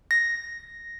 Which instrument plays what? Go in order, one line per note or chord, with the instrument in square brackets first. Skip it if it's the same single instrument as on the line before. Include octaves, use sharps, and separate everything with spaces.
[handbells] A#6